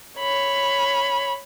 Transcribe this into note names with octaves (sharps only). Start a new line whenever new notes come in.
C#5 B5